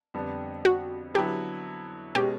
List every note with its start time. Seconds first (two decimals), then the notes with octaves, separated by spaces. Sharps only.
0.14 F2 D3 G3 B3 D4
0.65 F#4
1.14 D3 F#3 B3 E4 G4
2.15 B2 G#3 C#4 G4